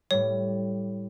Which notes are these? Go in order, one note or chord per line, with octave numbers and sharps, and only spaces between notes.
A2 G3 C#5